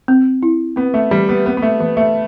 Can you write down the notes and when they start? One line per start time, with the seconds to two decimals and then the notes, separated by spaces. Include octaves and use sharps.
0.08 C4
0.43 E4
0.76 B3 C4
0.94 A3
1.11 E3 G3
1.29 B3
1.45 B3 C4
1.57 B3
1.62 A3
1.80 E3 B3
1.97 A3